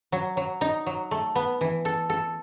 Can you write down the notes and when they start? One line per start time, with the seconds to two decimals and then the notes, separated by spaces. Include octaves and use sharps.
0.12 F#3
0.37 F#3
0.61 D#4
0.86 F#3
1.11 A3
1.35 B3
1.61 E3
1.85 A4
2.10 A4